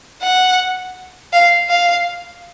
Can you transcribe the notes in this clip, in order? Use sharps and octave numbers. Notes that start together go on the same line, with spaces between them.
F#5
F5
F5